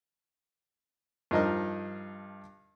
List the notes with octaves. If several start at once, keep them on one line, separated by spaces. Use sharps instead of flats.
G2 F3 D#4 A#4 D#5